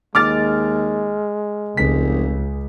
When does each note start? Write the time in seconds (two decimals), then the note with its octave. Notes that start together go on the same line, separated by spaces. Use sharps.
0.15 D#2 G#3 D6 F6 A6
1.77 F1 C#2 B6